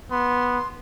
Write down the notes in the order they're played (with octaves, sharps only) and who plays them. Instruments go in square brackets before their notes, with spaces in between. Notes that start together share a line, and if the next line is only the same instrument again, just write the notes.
[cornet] B3 [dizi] C6